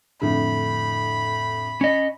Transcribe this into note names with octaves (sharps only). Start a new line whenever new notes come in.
F2 A2 D3 B5
C#4 D#5